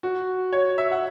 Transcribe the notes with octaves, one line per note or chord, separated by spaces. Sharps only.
F#4
C#5
E5
F#5